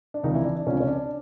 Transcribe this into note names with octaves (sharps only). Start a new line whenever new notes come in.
D4
C#2 C3 D#3 F3 D#4
E3 E4
D4
D4
C#2 C3 F3 C#4
C#4
D4